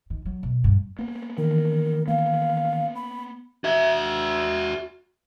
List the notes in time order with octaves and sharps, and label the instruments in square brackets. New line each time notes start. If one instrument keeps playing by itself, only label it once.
[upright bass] D#3
F#3
B2
G2
[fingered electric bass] A#3 B3
[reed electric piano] D#3 E3 [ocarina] A#4
[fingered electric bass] A#3 B3 [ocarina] F5
[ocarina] B5
[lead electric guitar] F#4 E5